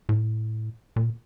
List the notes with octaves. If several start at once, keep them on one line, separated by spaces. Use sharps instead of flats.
A2
A#2